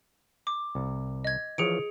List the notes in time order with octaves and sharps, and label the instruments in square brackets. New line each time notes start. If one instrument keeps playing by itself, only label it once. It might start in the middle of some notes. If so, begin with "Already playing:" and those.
[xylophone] D6
[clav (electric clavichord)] C2
[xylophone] D#5 G#6
[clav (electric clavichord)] E3 F3 C#5 [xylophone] G#4 C#7 D7